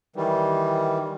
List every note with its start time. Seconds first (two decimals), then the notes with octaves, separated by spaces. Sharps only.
0.16 D#3 E3 G3